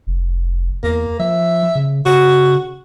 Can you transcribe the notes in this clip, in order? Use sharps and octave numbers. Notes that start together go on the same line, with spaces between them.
F1
E2 A#3
F3 E5
C#3
C#3 F#4